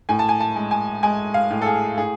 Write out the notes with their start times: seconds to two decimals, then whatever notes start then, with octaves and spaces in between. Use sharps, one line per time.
0.09 A2 G#5
0.19 A5
0.29 G#5
0.40 A5
0.56 G#3
0.71 G#5
1.03 G#3 G#5
1.34 F5
1.50 A2
1.62 A4
1.66 G#4
1.97 A2 G#4